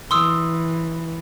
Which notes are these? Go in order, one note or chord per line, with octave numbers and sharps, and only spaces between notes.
E3 C6 D#6 E6